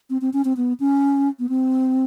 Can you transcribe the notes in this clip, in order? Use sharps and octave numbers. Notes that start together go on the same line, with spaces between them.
C4
C4
C#4
C4
B3
C#4
B3
C4